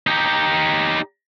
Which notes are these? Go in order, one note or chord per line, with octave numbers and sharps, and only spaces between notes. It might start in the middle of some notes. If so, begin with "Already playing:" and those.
D#4 G4